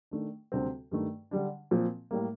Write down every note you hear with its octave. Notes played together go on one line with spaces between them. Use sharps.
D#3 A3 D4
D2 C3 G3 C4
G2 D#3 A3
D3 G3 D4
A#2 F3 C4
A2 G3 A#3